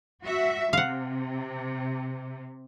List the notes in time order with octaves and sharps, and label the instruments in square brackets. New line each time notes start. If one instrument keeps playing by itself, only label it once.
[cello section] F#4 E5
[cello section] C3 [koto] F5 F#5